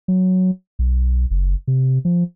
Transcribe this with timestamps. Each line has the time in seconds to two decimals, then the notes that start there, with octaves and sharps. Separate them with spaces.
0.08 F#3
0.79 B1
1.31 F#1
1.67 C3
2.05 F3